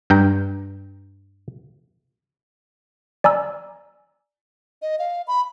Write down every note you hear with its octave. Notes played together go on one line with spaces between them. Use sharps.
G2 G5 A#5
D5 G#5 A#5 E6
D#5
F5
B5